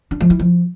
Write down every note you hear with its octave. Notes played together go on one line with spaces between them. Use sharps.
D4
F3
E4
F3